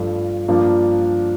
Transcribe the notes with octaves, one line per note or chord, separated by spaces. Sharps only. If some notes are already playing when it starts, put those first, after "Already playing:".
Already playing: G2 F3 A3
G2 F3 A#3 D4